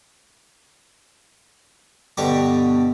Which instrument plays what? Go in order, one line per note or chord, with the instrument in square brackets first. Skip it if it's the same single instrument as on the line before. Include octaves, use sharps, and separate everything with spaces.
[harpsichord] G2 B2 D3 G4 C#6 D6